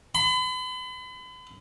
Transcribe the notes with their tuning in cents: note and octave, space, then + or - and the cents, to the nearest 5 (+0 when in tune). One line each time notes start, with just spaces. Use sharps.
B5 +40